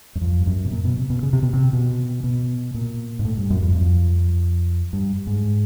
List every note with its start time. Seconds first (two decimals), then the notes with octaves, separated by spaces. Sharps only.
0.15 F#2
0.21 F2
0.41 G2
0.47 F#2
0.65 B2
0.72 A#2
0.85 B2
0.98 C3
1.10 B2
1.23 C#3
1.33 C3
1.43 B2
1.53 C3
1.73 B2
2.24 B2
2.74 A#2
3.19 G#2
3.25 A2
3.37 G2
3.50 F#2
3.62 F2
3.75 F2
4.93 G2
5.27 G#2